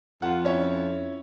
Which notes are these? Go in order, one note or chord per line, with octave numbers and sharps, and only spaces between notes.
F2 F4 F#5
C#4 E4 C#5